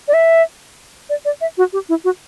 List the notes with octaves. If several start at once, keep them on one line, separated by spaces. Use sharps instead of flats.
D5
E5
D5
D5
E5
F#4
G4
E4
F#4